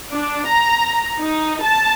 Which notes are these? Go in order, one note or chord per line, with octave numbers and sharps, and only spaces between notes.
D4
A#5
D#4
A5